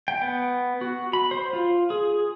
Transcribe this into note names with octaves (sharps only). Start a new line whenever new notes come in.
G5
B3
F#4
B5
C5
F4
G#4